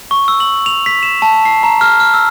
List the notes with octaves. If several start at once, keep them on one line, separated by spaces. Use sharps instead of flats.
C#6
E6
F#7
F7
B6
E7
A5
C7
A#5
F6
F6
E6